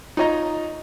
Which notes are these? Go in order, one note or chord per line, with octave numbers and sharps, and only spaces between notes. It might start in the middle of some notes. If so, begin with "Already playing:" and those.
D#4 F4 C#5 D#5 A#5